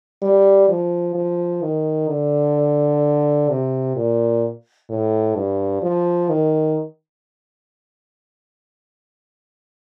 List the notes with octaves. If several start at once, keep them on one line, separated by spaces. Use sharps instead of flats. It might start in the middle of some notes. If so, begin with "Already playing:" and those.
G3
F3
F3
D#3
D3
C3
A#2
A2
G2
F3
D#3